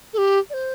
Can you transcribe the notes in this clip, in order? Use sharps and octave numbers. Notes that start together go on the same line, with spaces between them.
A4
G4
D5
C5